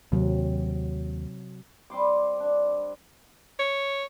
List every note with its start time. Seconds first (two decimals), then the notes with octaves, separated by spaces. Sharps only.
0.12 D#2 C3 F#3 C4
1.90 G3 C4 C6 D6
2.40 D4
3.59 C#5